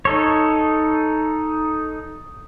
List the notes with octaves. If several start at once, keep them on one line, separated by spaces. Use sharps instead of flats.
D#4 A4 C#5